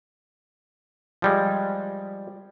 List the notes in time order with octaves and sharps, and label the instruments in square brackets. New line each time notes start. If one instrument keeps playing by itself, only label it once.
[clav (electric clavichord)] F3 G3 G#3